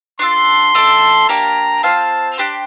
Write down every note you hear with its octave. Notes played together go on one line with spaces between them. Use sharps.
D4 F4 A4 C6
A3 D4 A4
A#3 D4 G4 D5 A#5
C4 F4 C5 F5 A5
D4 G4 C5